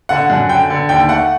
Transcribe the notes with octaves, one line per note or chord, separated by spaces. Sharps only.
D3 F#5
F#2
D3 G5
D3
D#2 G5
A3 F#5